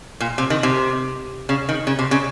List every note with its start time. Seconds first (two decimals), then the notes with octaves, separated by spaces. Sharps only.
0.20 A#2
0.38 C3
0.50 D#3
0.63 C3
1.49 C#3
1.69 D#3
1.87 C#3
1.99 C3
2.11 C#3